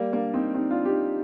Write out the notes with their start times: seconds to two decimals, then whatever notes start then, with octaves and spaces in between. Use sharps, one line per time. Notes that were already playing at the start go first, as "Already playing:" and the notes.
Already playing: G3 A#3
0.12 A#3 D4
0.34 C4 D#4
0.54 C4 D#4
0.70 D4 F4
0.85 D#4 G4